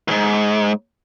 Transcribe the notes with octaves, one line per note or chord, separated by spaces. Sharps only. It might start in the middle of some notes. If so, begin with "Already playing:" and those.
D#2 G#2